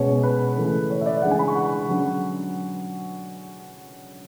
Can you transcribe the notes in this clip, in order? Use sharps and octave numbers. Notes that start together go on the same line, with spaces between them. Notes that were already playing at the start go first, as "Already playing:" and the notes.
Already playing: B2 G#3 C#4 C#5
B4
C#3 E3 A3
C#5
E5
D5
C#3 E3 G#3 D4 F#5
G#5
B5
C#6
F#5
D3 F#3 C#4